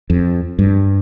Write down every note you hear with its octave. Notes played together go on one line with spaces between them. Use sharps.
F2
G2